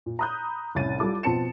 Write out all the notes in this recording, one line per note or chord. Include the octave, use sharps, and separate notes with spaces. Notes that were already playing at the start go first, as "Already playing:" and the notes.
A#2
A#5 B5 D#6 F#6 G6
C2 A2 C#4 A6 D#7
G3 F4 A4 D6
B2 F3 C4 A5 C#7 E7